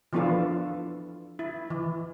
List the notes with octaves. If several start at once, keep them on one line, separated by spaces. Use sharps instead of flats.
E3 F3 B3 D4 F4 A4
E4
E3